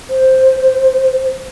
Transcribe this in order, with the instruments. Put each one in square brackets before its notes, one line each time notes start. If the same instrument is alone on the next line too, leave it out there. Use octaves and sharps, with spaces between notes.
[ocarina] C5